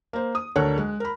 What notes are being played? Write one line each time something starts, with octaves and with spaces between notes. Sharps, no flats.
A#3 C5
D#6
D2 D4 A4 A#4 C#5 F#6
G#3
A#4 B5